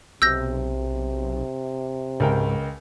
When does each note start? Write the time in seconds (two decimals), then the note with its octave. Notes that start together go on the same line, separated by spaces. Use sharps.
0.22 B1 C3 E6 G6 A#6
2.20 C#2 G#2 A#4 G5